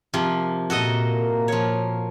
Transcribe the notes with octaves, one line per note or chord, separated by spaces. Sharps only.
C3 F3 A#3
A#2 A#3 F#4 A4 D#5
F3 C#5